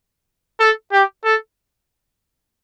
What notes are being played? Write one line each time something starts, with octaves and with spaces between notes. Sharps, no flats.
A4
G4
A4